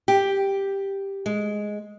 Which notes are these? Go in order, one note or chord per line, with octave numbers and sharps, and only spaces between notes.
G4
G#3